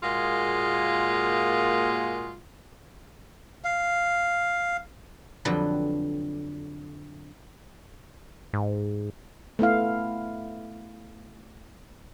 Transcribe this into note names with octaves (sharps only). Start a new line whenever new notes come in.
A#2 G#3 A#3 F4 F#4 G#4
F5
F2 D3 F#3 G3 B4
G#2
A3 B3 E4 F5